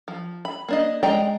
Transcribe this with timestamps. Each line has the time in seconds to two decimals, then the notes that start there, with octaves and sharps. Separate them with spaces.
0.08 F3
0.45 B5
0.68 A#3 D4 D#5
1.03 G#3 D5 D#5 G5 A#5